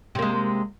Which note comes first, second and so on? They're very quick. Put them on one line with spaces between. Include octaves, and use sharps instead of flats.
C3 A#3 G#3